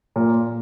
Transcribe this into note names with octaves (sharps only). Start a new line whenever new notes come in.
A#2